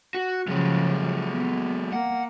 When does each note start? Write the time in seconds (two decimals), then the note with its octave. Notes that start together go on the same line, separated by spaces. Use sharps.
0.15 F#4
0.48 C#3 F3 F#3 G#3
1.28 B3
1.93 A#3 F#5